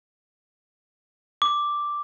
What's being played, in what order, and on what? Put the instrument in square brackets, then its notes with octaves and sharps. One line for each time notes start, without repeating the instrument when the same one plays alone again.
[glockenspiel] D6